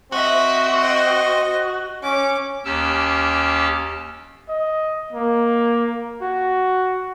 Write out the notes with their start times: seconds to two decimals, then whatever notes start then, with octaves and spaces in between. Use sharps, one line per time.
0.12 C4 F#4 D#5 E5
0.82 D#5
2.03 C#4 D6
2.65 D#2 C#4 G4 A5 E6 F6
4.49 D#5
5.13 A#3
6.22 F#4